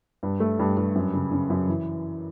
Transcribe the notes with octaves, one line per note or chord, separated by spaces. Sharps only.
G2
A3
G2
G2
F#2
C#3
C#3
F#2
E3